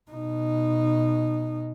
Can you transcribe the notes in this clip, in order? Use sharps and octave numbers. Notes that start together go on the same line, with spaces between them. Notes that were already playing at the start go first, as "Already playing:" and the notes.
B2 D#4